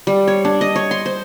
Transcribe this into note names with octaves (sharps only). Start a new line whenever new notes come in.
G3
C#5
D4
D#5
C#5
C6
C5